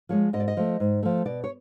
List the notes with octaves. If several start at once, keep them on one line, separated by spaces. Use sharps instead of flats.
F3 G#3 C#5
G#2 D#5
D5
D#5
F3 A3
G#2
F3 A3
B2 D5
C#5